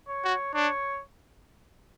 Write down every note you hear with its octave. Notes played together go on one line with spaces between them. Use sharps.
C#5
F#4
D4 C#5